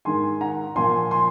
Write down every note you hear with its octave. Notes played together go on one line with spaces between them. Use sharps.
G#2 D#3 G#5 C6
F#5 A#5
A#2 F3 G#5 C6
G#5 C6